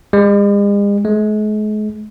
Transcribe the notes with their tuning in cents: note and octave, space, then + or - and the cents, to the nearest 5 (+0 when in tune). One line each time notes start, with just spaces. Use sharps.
G#3 -45
G#3 +40